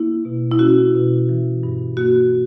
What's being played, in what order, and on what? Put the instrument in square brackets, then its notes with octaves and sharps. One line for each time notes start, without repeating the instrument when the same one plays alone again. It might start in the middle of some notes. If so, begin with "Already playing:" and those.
Already playing: [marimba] A#3 E4
B2
E4
C#4 F#4
B2
E3
G2
A#3 F#4